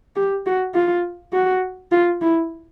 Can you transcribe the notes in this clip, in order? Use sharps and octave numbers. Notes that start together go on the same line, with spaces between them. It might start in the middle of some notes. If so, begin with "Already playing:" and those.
G4
F#4
F4
F#4
F4
E4